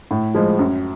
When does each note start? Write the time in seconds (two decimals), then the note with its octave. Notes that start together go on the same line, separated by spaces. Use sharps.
0.11 A2
0.35 F3 G#3
0.59 F#2